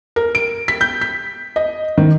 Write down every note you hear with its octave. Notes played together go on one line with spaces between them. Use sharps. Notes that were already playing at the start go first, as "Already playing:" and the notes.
A#4
D7
B6
G6
B6
D#5
D#3